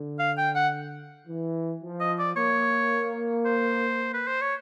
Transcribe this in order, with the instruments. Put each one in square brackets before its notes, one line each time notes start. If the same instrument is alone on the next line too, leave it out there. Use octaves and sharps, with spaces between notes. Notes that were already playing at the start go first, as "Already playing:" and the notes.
Already playing: [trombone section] D3
[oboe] F5
G5
F#5
[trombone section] E3
F3
[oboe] D#5
D5
[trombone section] A#3 [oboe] C#5
[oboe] C5
B4
C5
C#5